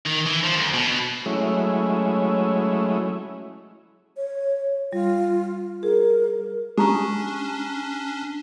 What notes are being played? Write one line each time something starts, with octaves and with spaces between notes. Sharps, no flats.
D#3
E3
F3
D2
B2
F#3 G#3 A3 C#4 E4
C#5
G3 F4
G#4 A#4
G#3 C#4 D4 G4 A#5 C#6